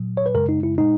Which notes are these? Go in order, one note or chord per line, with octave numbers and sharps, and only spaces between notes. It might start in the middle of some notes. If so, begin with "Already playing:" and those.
Already playing: A#2 F#3
C#5
B4
F#2 C#3 G#3 A#4
D#4
E4
A#2 G#3 D#4